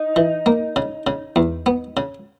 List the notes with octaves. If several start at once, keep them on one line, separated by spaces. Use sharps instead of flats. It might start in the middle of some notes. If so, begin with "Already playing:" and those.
Already playing: D#4
E3
A#3
C#3
C#3
E2
B3
C#3